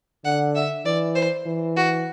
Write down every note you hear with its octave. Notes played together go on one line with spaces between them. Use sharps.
D3 F#5
E5
E3 D5
C5
E3
F#4